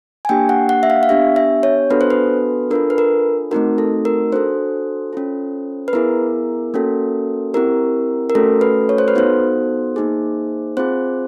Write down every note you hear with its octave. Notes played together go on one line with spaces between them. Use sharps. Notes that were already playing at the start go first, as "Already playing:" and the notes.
G#5
A#3 D4 G4 G5
F#5
F#5
E5
F5
F5
B3 D4 G4 E5
E5
C#5
B3 D4 F#4 A4 B4
C5
B4
D4 F4 A4 A#4
B4
A#4
A3 C4 D#4 F#4 A#4
A4
A#4
D4 F#4 A4 C5
C#4 F4 A4
B4
B3 E4 G#4 A#4
A#3 C#4 F#4 A4
C4 E4 G4 A#4
A#4
A3 C#4 F#4 A4
B4
C#5
C5
B4
B3 D#4 F#4 A4 C5
A#3 D#4 G#4
C4 F4 G#4 C5